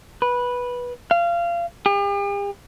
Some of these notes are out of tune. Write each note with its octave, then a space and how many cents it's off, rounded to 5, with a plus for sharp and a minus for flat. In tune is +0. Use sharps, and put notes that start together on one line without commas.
B4 -10
F5 -25
G4 +45